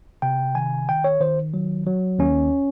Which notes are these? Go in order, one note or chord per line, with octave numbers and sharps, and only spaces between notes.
C3 G5
D#3 G#5
D#3 G5
C#5
D#3 C5
F#3
F#3
D#2 C#4